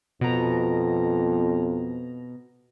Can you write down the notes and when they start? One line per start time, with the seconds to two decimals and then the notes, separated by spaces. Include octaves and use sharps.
0.21 F2 B2 A#5